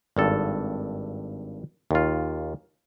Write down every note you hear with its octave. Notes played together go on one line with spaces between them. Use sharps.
G#1 G2 A4
D#2 F4